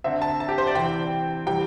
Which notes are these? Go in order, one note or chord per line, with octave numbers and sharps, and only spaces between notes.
D3 C4 E5
A5
A5
G4
C5
D5
C3 E3 C4 G5
C3 E3 G3 C4 G5